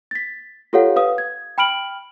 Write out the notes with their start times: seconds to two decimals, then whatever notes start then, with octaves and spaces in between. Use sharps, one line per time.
0.11 A6 B6
0.73 F4 G4 A4 C#5 F5 F#5
0.96 B4 F5 D#6
1.18 G#6
1.58 G5 B5 F6 D7 F#7